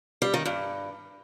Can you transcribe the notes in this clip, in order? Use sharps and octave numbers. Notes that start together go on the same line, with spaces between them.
G3
D#3
G2